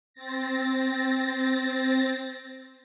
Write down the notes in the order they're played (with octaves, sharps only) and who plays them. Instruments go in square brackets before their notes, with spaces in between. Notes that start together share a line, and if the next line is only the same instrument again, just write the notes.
[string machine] C4 A6 A#6